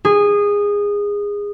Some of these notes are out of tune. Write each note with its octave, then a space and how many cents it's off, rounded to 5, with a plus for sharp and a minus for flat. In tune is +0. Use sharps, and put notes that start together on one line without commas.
G#4 -20